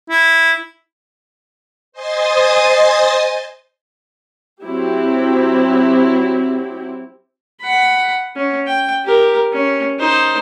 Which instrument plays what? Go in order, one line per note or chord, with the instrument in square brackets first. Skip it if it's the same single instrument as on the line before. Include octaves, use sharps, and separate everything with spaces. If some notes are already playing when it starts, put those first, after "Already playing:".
[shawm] E4
[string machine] C5 D#5 G#5 C6 D#6 A6
[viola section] F#3 C4 E4 G4
[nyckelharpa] F#5 B5
C#4
G5
G4 A#4
C#4
D#4 C5